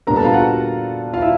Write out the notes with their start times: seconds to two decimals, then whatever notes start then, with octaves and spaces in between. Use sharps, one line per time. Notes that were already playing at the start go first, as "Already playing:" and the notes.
0.07 A#2 G3 B3 D4 A#4 A#5
0.16 A4 A5
0.24 F4 F5
0.34 F#4 F#5
1.13 F4 F5
1.22 E4 E5